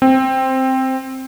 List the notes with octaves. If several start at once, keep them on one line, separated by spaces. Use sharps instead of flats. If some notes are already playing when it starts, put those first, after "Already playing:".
C4